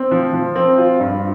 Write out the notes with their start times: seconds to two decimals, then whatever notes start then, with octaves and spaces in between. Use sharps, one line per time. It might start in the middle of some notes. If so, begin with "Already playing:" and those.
Already playing: C4
0.11 F3
0.33 F3
0.55 C4
0.78 F4
1.00 G2